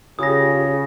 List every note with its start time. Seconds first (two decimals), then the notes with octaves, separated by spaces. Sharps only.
0.19 C#3 F4 G4 G#4 D#6 A#6